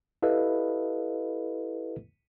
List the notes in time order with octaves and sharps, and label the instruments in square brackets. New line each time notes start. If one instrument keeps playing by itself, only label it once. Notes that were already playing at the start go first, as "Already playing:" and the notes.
[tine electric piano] E4 G4 A4 B4 D#5 F5